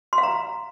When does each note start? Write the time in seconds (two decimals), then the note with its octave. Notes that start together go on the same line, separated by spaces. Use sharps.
0.13 C6
0.18 F5
0.23 A#5